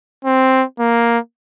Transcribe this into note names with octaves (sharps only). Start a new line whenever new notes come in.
C4
A#3